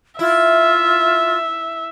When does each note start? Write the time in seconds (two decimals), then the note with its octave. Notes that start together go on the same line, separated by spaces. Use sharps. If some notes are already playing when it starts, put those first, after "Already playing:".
0.19 E4 F4 E5